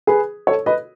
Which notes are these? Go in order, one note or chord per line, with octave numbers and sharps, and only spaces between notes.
G#4 B4
A4 C#5
B4 D#5